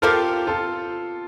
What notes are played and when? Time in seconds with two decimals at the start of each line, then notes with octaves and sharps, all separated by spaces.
0.02 F3 C4 F4 G4 A4 A#4
0.47 F4 A4